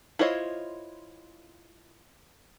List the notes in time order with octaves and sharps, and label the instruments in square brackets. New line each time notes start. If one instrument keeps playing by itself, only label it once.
[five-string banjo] E4 F4 C5 C#5 D#5